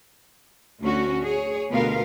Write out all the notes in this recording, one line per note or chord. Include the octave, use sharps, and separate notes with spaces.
D2 C#4 F#4
G#4 C#5
D2 B2 B3 F4 A#4 F5